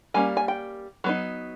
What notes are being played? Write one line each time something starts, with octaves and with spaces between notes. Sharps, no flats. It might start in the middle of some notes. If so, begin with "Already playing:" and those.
G3 A#3 C#4 G#5
G#5
G5
F#3 B3 D#4